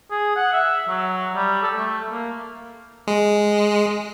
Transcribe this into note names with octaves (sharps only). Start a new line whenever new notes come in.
G#4
F#5
E5
F#3
G3
A4
A3
A#3
G#3